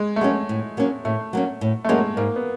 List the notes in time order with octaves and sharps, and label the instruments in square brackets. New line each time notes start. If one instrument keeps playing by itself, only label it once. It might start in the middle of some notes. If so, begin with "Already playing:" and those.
Already playing: [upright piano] G#3
A3
[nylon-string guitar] F#3 A#3 C#4 [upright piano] G#3
[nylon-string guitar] A2
F#3 A#3 C#4
[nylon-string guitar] A2 [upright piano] A3
[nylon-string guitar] F#3 A#3 C#4
A2
[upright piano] A3
[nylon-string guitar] F#3 A#3 C#4 [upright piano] G#3
[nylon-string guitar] G#2 [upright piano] A#3
[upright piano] B3